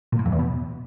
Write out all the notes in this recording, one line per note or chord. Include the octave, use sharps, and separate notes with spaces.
A#2
A2
F2
E2
B2